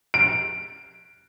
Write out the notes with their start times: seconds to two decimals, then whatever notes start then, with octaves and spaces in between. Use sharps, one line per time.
0.14 D7